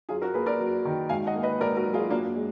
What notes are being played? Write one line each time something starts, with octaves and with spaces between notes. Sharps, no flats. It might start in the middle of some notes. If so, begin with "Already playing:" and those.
F#2 F4 G#4
F#4 A#4
A#3 G#4 B4
A#4 D5
F#2
D#3
G#2 F5 G#5
D#5 F#5
A#3
B4 D#5
G#2 A#4 D5
F#4 A#4
F#3
F4 G#4
F#2 A#3 D4
G#3